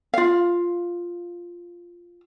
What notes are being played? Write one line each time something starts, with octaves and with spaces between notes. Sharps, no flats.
F4 F5